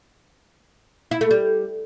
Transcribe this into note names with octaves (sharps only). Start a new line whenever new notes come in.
E4
A3
G3